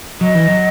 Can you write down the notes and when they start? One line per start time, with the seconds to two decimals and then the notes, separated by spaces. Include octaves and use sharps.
0.21 F#3 D#5
0.35 E3
0.48 F#3